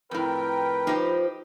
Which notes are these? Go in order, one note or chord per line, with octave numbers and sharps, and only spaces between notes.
F2 A2 A#4 B4 G5
F3 D#4 F4 G4